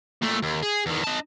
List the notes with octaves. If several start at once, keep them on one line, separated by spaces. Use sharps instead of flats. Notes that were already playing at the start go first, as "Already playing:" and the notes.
A#2 A3
D#2
G#4
E2 D#3
D#4 A5